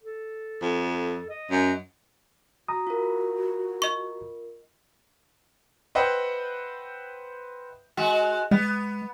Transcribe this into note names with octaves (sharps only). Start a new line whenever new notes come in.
A4
F2
D#5
F#2
F#4 A#5 D#6
F4 A#4
D#5 C#6
B4 C5 D#5 E5 F#5 G5
G#3 F#4
G#3 B3